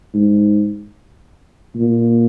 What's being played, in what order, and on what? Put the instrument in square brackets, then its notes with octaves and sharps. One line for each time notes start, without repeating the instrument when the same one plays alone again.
[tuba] G#2
A#2